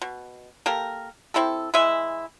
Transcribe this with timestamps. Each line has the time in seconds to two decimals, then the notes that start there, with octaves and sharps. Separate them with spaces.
0.02 B2
0.66 A#3 G4 A4 A#4
1.34 C4 E4 G4 A4
1.74 E3 G#3 E4 E5